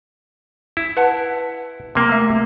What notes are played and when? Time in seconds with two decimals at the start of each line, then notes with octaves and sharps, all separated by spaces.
0.77 E4
0.97 B4 F#5 A5
1.95 C3 A#3
2.09 A3 E5